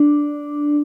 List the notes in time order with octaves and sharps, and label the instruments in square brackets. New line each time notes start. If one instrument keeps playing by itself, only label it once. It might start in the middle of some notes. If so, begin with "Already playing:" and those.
Already playing: [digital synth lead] D4